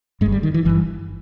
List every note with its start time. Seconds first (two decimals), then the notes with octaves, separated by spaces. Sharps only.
0.21 G2 G#3
0.26 G1
0.32 G3
0.43 D#3
0.54 E3
0.65 G1 G2 E3